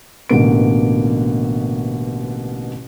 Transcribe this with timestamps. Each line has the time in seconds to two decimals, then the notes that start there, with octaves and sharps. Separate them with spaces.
0.29 A1 B2 D3 A#3 D7